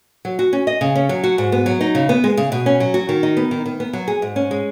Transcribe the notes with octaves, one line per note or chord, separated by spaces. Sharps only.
F#3
F#4
C#4
D#5
C#3
C#4
F#3
F#4
G#2
B3
F#3
D#4
C#3
B3
G#3
C#3
B2
C#4
F#3
F#4
D#3
D#4
B3
D#3
D#3
B3
F#3
G#4
G#2
C#4
G#3